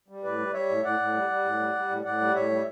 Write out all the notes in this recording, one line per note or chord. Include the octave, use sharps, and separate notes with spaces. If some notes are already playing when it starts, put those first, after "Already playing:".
G3
A2 B4 D5
G3
G3 C#5 E5
A2
A2 D5 F#5
A2
G3
G3
A2
G3
G3
A2
A2 D5 F#5
G3
A2 C#5 E5
G3